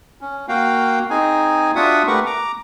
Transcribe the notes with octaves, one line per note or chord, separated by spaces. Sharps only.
C#4
A#3 F#4 F5 G5
C4 D#4 G#4 G#5
D4 F4 F#4 E5 F#5 D#6
A3 G4 A#4 B4 F#5 C#6
A#5 D6